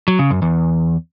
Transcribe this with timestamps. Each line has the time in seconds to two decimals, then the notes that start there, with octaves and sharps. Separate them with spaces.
0.08 F#3
0.19 C#3
0.31 F#2
0.42 E2